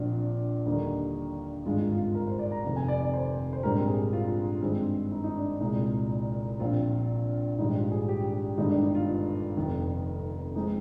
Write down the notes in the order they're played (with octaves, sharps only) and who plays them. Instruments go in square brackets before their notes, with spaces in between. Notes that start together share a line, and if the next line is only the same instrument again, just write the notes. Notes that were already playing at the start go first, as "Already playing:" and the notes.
Already playing: [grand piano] A#1 A#2 F3 C4 D4
D#2 D3 G3 A#3 D#4
G#1 G2 D3 G#3 F4
D#4
F4
A#4
C5
D5
A#5
F1 F2 C3 D#3 A#5
G#5
D5
D5
C5
C5
A#1 G#2 G3 C4 A#4
G#4
F4
G2 D#3 G#3 C4
D#4
D#4
D4
C2 A#2 G#3 D#4
A#1 A#2 F3 C4 F4
A#1 G#2 D#3 G3 D#4
F4
G#4
G4
G4
G1 G2 D#3 G#3 D#4
D4
D#4
F4
F1 F2 D#3
F3 G#3 C4 D#4